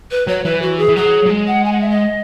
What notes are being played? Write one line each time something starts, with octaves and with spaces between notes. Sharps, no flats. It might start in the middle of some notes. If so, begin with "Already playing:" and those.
B4
F#3 C#5
E3 B4
F#4
G#4
E3
F#3 G#4
F#3
G#3
F#5
G#5
F#5
E5
D#5